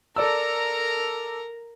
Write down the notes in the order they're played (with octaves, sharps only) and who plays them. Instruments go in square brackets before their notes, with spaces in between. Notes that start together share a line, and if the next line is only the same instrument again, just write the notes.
[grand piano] A4 D5 E6 [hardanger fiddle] A#4 A#5